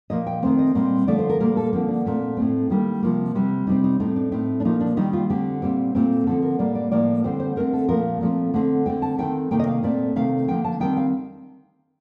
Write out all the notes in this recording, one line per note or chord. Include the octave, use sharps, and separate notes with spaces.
A#2 F3 A#3 D#5
G5
D#3 A3 C4 C5
D#5
A#2 G3 C4
D3 F3 A3 D5
C5
A#4
A#2 G3 A#3 A#4
A4
D3 F3 A#3 C4
D4
A#2 A3 C4
A2 A3 C4
D#3 G3 A#3
C3 F3 A#3
C3 G3 C4
C3 G3 C4 D#4
D#4
A2 A3 C4 D#4
D4
A2 A3 C4 D#4
D4
A#2 F3 A#3 D#4
D4
D#3 G3 A#3 D#4
F4
D3 A3 C4 G4
A#2 G3 C4
A#2 A3 C4
D3 F3 C4 A4
A#4
A2 G3 A#3 D5
D5
A2 F3 A#3 D5
D3 G3 C4 C5
C5
D3 A3 C4 A#4
A4
A#2 F3 A3 A#4
A#2 F3 A3 C4
D3 A3 C4
D3 A3 C4 G5
A5
D#3 A3 C4 G5
C3 D#3 A#3 G5
D#5
F5
A#2 A3 C4 D5
C3 D#3 A3 C4 F5
D3 F3 A#3 G5
A5
D#3 G3 C4 G5
F5